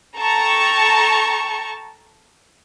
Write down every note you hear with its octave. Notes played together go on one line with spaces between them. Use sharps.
A4 G5 A5 A#5 C#6